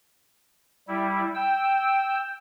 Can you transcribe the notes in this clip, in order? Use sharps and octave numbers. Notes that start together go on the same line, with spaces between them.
G3 E4
G5 E6